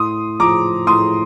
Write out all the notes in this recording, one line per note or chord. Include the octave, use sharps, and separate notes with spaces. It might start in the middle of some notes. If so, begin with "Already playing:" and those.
Already playing: A2 C6 D#6
F3 A#5 D6
A2 C6 D#6